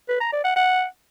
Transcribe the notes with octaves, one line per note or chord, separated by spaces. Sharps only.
B4
A#5
D5
F#5
F#5